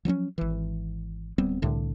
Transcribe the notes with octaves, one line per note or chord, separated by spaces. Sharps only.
F3 F#3 C4 C#4
G#1 E3
D1 G3 B3 C4
C2 A2 D3